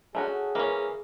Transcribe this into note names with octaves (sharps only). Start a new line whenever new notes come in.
A3 C#4 F#4 G#4
E3 A#3 C#4